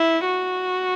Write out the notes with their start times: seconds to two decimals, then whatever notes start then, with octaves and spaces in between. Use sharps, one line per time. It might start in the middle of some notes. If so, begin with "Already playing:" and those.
Already playing: E4
0.26 F#4